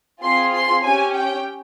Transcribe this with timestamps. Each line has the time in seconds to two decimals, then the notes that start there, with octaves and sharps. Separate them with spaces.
0.21 C4 F4 G#4 C6
0.53 C6
0.83 C#4 G4 G#5
1.14 G5